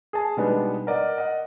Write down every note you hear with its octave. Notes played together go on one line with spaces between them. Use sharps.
G#4 A5
B2 G3 G#3 B3 D4 D#4
A#4 D5 D#5 F#5
D#5 F#5